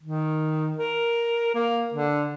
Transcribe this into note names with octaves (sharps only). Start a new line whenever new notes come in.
D#3
A#4
A#3
D3